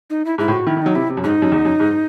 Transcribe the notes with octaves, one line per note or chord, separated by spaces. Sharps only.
D#4
E4
G#2 E4
A2
F#4
D#3 E4
D#3
F#3 D#4
C3 E4
C3
F#2
G#2 D#4
F#2
E2
F#2
G#2